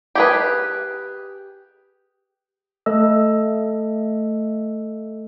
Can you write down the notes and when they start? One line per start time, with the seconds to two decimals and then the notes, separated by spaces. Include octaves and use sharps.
0.15 G4 G#4 B4
2.86 A3 A4 D#5 E6